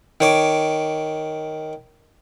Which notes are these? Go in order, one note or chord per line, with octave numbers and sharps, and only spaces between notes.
D#3 C#5 D6